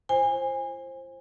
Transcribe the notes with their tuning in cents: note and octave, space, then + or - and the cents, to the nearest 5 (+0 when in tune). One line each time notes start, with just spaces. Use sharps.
F4 -40 C5 +20 G#5 -25